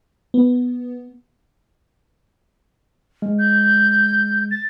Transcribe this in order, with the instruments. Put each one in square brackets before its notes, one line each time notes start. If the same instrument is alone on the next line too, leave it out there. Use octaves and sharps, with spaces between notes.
[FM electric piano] B3
[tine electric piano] G#3
[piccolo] G6
A6